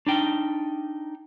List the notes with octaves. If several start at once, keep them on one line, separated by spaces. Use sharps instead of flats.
D4 D#4 G5